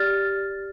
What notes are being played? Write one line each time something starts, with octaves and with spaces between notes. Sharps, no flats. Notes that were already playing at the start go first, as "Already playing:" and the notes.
Already playing: G4 D5 F6 A6